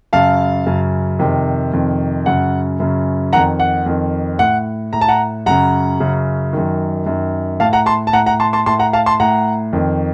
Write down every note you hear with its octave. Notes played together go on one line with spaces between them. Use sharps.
F#2 C#3 F5 A5
F#2 C#3
F2 C3 D#3
F2 C3 D#3
F#2 C#3 F#5
F#2 C#3
F2 D#3 F#5 A#5
F#5
F2 D#3
A2 F#5
A2 A#5
A5
F#5 A#5
F#2 C#3 F#5 A#5
F#2 C#3
F#2 D#3
F#2 D#3
A2 F5 A5
F#5 A#5
A5 C6
A5
A2 F#5 A#5
F#5 A#5
A5 C6
A5 C6
A2 A5 C6
F#5 A#5
F5 A5
A5 C6
A2 F#5 A#5
F2 D#3